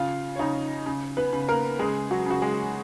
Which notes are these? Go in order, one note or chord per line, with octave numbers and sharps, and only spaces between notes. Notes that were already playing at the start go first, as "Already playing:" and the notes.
Already playing: C#3 F4 F5
C#5
C#3 D#4 D#5
C#3
B3 B4
C#3
A#3 A#4
C#3 G#3 G#4
F#3 F#4
C#3 F#4
G#3 G#4